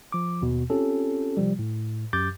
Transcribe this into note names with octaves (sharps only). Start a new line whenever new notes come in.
F3 D6
D#2 B2
C4 C#4 F4 G4 A4
C3 F3 G3
A2
F#2 G4 D6 G6 A6